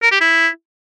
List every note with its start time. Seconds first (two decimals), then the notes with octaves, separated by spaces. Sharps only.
0.02 A#4
0.12 G4
0.21 E4